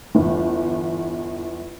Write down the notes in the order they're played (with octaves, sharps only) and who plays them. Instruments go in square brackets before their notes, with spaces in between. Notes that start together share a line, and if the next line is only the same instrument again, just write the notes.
[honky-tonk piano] G1 E2